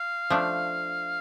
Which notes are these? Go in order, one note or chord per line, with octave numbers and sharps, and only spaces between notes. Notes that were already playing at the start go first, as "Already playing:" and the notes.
Already playing: F5
F3 A3 D4